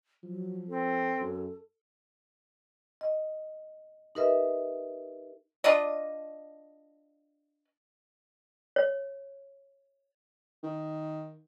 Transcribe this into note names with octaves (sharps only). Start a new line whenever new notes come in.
F3 F#3
C4 A4
F#2
D#5
D#4 G4 A#4 B4 D#5 E5
D4 F4 D5 D#5
C#5
D#3